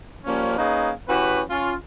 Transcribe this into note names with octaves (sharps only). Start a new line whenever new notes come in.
F3 G3 A#3 C#4
A#3 C#4 D#4 G#4 B4
E3 C#4 F#4 G4 B4
C#4 F4